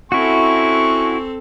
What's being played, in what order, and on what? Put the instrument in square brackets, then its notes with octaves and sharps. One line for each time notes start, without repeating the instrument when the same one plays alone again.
[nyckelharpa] C4 A4 [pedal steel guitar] E4 F#4 [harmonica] G#5 C#6